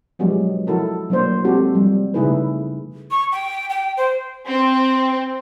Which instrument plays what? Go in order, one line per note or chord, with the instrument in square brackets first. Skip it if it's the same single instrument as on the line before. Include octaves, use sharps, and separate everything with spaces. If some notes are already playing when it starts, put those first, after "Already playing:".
[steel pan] F3 F#3 G#3 B3 D4 G4
F3 E4 F#4 A4 A#4
F#3 A3 A#3 D4 C5 C#5
G#3 C4 F#4 G4 A4
F3 G3
C#3 A3 D#4 E4 G#4 B4
[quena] C#6
G5
G5
C5
[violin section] C4